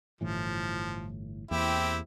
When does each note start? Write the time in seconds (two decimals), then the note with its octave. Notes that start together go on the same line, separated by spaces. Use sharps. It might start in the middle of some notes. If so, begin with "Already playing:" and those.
0.21 G1 A2 E3 F3
1.51 E2 A#3 C4 E4 G4